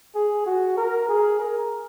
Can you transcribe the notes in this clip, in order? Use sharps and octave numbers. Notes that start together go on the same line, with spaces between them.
G#4
F#4
A#4
G#4
A#4